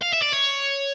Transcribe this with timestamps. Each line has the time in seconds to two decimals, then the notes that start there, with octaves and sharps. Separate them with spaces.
0.02 F5
0.13 E5
0.22 D5
0.33 C#5